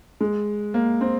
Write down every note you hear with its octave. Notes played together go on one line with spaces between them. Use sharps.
G#3
A#3
C4